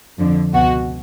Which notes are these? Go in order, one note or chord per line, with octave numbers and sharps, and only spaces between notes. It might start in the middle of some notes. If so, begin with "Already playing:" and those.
F2 D3
C#2 B2 F#4